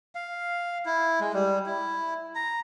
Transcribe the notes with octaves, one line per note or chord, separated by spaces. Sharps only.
F5
E4
G#3
G3
E4
A#5